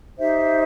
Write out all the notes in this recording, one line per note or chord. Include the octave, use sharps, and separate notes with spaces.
D#4 G4 C5 E5